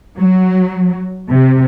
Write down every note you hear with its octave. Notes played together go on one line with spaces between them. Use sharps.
F#3
C3